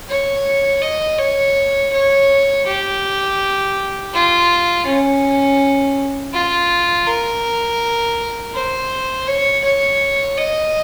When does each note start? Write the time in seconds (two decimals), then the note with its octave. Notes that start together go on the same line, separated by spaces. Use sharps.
0.09 C#5
0.82 D#5
1.18 C#5
1.93 C#5
2.66 G4
4.13 F4
4.86 C#4
6.33 F4
7.07 A#4
8.54 C5
9.28 C#5
9.64 C#5
10.38 D#5